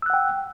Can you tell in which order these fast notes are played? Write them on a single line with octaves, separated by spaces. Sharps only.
E6 F#6 F#5 G5